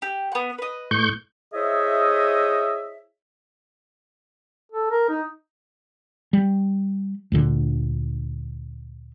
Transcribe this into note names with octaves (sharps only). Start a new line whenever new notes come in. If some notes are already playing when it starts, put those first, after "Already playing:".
G4
B3 F#5
B4 D#5
A2 C#6 G6
E4 G#4 C5 C#5 D#5 E5
A4
A#4
D#4
G3
D2 A#2 D3